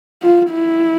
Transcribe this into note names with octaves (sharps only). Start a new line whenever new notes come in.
F4
E4